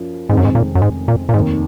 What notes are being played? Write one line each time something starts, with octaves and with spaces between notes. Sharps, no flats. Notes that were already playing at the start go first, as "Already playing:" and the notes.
Already playing: F#2 F3
F1 F2 G#2 D#3 G#3 C4
F#2
G#2
A#2
F#2
G#2
A#2
A#2
F1 D#2 G#2 D#3